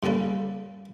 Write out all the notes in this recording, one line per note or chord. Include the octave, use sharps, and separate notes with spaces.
G2 C#3 A#3 A4 B4